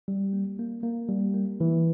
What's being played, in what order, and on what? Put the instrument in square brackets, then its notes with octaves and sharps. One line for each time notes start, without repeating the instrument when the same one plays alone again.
[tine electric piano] G3
A#3
A#3
A#3
G3
A#3
E3